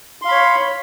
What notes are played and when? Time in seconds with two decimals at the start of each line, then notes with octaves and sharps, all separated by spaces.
0.22 C6
0.25 F5
0.28 B5
0.31 C#5